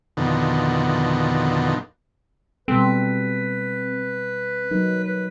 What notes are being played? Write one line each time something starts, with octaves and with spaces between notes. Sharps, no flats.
F2 B2 D3 D#3
B2 G3 C4 A4 B4
F#3 D#4 A#4
B4